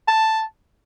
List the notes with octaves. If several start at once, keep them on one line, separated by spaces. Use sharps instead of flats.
A5